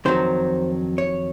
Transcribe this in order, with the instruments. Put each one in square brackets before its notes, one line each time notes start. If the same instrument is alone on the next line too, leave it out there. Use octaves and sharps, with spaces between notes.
[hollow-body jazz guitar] F2 D#3 F#3 C5
C#5